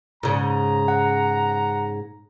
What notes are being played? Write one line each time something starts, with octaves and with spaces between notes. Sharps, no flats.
G#2 C#3 A#5
F#5